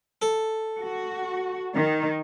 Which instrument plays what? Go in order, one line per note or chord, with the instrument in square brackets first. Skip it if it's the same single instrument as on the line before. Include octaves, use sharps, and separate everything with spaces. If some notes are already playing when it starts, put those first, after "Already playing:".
[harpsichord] A4
[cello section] F#4
D#3